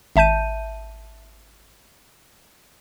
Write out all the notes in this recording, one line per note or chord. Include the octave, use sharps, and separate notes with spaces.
G#1 E5 A5 G6 D#7